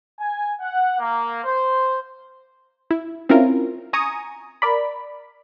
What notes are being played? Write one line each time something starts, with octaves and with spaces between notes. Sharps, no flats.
G#5
F#5
A#3
C5
E4
C4 C#4 E4 F4 A#4
G#5 A#5 C#6 D#6
A#4 D5 B5